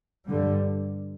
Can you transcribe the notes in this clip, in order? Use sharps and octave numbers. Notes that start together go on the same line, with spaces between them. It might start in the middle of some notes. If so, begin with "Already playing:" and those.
G2 D3 G3